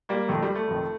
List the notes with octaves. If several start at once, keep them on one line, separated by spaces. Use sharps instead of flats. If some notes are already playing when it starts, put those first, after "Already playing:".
G3 A#3
F1 F2 D#3 A3
G3
A3
F1 F2 D#3